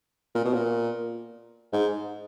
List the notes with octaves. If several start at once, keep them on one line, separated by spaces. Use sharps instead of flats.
A#2
B2
A#2
G#2